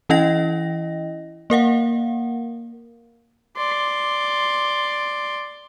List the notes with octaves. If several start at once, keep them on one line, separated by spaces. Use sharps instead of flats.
E3 C#4 E4 D#5 G5 A#6
A#3 A#4 F5 F#5
D5 C6